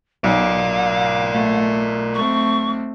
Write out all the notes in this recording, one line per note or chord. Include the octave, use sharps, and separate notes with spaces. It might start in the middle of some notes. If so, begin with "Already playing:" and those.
B1 A#4 D5 F5
A3
A3 C4 C#6